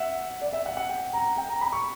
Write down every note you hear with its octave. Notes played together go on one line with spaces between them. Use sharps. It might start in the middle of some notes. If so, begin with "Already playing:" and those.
Already playing: E5 F#5
D5
E5
F#5
F#5
G5
A#5
G5
A#5
B5
C#6